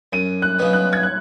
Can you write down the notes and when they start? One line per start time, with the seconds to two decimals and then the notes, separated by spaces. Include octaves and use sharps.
0.13 F#2 D#7
0.42 F#6
0.59 C#3 F#3 B3 D#4
0.73 F#6
0.93 G#6
1.03 F#6